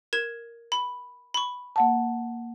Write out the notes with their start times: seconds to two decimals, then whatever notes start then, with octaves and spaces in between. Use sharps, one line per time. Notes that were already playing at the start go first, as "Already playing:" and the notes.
0.13 A#4 G#6 E7
0.72 B5
1.34 B5 C#6
1.76 A#3 F#5 A5